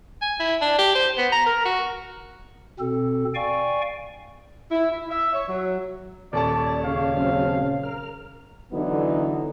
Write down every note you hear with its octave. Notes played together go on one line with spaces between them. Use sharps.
G#5
E4
D4
G4
C5
B3
A#5
A#4
F#4
B2 C4 A4
D5 F5 G5 G#5 C#6
E4
E4
E5
C#5
F#3
D#1 A4 C#5 D5 A5
C#3 F5
F#3 C4 C#4
A#4 F6
D3 E3 F#3 B3 D#4 E4